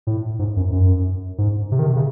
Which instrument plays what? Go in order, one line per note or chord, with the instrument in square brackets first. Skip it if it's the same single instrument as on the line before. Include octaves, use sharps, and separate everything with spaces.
[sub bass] A2
G#2
F#2
F#2
G#2
C3
D#3
C3
C#3